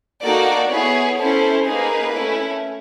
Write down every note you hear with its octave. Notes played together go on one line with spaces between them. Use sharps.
A#3 D#4 F#4 A4 D5
B3 E4 G#4 C#5
C#4 E4 A4 C5
A#3 D#4 G#4 B4
A3 C#4 E4